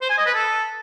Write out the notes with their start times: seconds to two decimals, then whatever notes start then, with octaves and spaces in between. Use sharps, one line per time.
0.01 C5
0.10 G#5
0.18 D#5
0.26 B4
0.34 A4